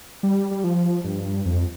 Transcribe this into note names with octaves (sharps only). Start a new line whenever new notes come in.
G3
G3
F3
G2
F2